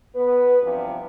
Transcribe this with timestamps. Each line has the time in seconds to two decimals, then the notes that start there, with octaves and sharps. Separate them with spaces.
0.15 B3 B4
0.62 E2 G2 C3 F3